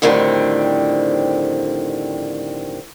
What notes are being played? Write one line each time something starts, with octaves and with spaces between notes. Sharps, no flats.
F2 A2 D3 D#3 G3 C4